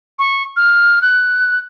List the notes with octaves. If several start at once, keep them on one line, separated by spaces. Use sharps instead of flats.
C#6
F6
F#6